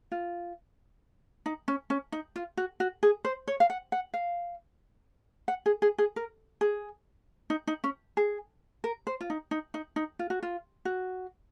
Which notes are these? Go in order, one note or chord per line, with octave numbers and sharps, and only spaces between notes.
F4
D#4
C#4
C#4
D#4
F4
F#4
F#4
G#4
C5
C#5
F5
F#5
F#5
F5
F#5
G#4
G#4
G#4
A#4
G#4
D#4
D#4
C#4
G#4
A#4
C5
F4
D#4
D#4
D#4
D#4
F4
F#4
F4
F#4